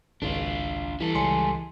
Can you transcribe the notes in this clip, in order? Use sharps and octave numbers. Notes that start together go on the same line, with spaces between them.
G#1 C#2 D4 F4
E3 G3 A4
C#2 G#5 C6 C#7